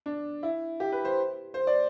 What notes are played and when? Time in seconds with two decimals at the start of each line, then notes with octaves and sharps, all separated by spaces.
0.06 D4
0.43 E4
0.80 G4
0.92 B4
1.05 C5
1.54 C5
1.67 D5